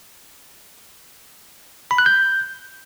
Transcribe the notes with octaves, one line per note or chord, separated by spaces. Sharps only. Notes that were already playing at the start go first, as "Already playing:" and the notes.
B5
F#6
G6